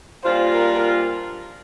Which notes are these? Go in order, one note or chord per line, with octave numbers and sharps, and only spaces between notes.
A#2 G3 D4 F4 C5
A#4